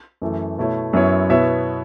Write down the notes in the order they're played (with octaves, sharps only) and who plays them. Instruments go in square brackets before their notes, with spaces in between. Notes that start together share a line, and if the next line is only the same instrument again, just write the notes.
[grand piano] F#2 E3 A3
B2 A3 E4 C#5
F#2 F#3 B3 E4 C#5
B2 B3 E4 C#5 E5